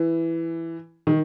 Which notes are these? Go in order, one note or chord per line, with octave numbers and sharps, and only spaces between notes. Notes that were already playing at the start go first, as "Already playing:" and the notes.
Already playing: E3
D#3